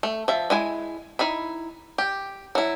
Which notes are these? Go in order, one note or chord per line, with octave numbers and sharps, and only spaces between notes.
A3
F3 E5
G#3 E4 G#5
D#4 E4 B5
G4
F#3 E4